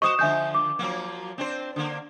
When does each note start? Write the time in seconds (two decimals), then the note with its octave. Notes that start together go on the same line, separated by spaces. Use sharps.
0.02 F#4 C5 D#5 C#6 D#6 E7
0.19 D3 F3 E5 G#5 G6
0.55 D6
0.79 F3 F#3 A#3
1.38 C4 D4 C5
1.76 D3 A#3